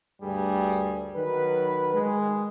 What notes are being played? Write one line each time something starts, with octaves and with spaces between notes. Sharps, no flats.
D2 G2 G3 A3 G#4
D#3 F#3 B4
D#3 G#3